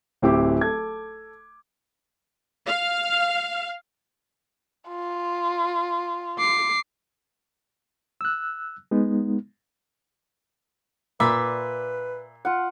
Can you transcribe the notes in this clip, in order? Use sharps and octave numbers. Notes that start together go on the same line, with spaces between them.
D1 C4 E4 G4 D6
A4 G#6
F5
F4
D6 C7
E6 F#6
G#3 B3 D#4
A#2 B4 D5 E5 B5
F4 F#5